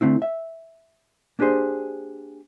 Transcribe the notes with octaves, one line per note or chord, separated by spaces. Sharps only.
D3 A3 C4 E4
E5
A#3 D4 G4 G#4 C5